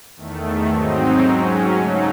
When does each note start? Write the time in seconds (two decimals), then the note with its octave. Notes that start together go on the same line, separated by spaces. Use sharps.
0.16 E2 D#3 A3
0.69 G#2 F#3 C4 D#4
1.22 G#2 F#3 C#4
1.75 C#3 F#3 A3 D#4